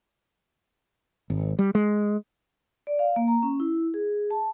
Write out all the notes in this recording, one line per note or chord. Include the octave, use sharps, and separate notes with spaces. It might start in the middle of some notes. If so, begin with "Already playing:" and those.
G#1
G3
G#3
D5
F5
A#3
A#5
C#4
E4
G#4
A5